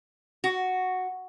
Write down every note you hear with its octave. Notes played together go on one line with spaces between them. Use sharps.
F#4